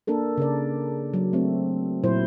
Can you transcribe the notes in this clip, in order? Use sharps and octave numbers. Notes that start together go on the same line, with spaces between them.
A#3 D4 A4 A#4
C#3 A#4 D5
F#3
A3 C4
A#2 F#3 E4 C5